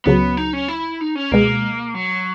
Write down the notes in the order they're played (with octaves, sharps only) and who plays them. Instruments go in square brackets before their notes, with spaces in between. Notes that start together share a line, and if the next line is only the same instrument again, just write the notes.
[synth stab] C#2 C#3 F#3 [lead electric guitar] B3
[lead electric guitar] D#4
C#4
E4
D#4
C#4
[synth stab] C#2 B2 G#3 [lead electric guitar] A#3
[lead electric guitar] F#3